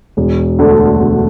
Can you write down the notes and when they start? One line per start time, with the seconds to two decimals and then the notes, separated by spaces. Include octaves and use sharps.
0.17 E1
0.59 D2 D3 A3
0.99 E1